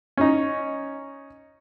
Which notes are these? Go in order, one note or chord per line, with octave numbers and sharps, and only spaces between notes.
C#4 D#4